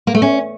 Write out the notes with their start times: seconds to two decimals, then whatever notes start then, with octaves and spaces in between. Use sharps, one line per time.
0.07 A#3
0.15 A3
0.22 C#4